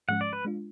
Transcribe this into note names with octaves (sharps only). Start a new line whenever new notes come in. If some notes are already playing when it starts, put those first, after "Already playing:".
G#2 F3 G#3 C#4 F#5
D5
B4
G#3 D4 F4